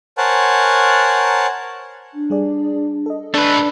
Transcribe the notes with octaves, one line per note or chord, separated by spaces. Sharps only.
A#4 C5 C#5 F#5 G#5 A5
D4
G3 G#4 D5
A4 D#5
A3 D4 B4